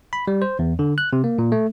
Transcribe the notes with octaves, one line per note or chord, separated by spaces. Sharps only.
B5
G3
C5
E2
D3
F#6
C3
A#3
A#2
A3